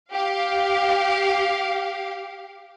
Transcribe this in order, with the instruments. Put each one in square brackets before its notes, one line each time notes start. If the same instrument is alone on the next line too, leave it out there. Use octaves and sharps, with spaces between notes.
[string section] G4 F5